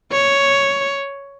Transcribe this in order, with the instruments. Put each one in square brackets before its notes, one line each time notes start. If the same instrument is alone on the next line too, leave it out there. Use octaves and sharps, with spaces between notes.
[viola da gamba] C#5